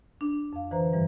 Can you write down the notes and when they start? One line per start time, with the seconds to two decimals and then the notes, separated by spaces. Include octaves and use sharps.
0.21 D4
0.53 F2 F5
0.71 D3 E3 B4 C5 A#5
0.93 G2 E3 G3